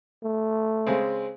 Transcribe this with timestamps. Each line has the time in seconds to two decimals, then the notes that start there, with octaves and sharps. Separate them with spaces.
0.24 A3
0.87 C#3 G#3 C4